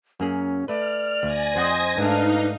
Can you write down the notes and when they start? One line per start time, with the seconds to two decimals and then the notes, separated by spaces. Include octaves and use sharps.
0.20 F#2 A#3 C#4 G#4
0.68 A3 B4 D5 F6
1.23 D2 G#5 A#6
1.56 F2 C5 D#5 F#5
1.97 G#2 A3 D4 D#4 B4 F5